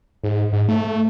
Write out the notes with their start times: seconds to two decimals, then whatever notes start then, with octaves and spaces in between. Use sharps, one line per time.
0.24 G#2
0.53 G#2
0.68 A3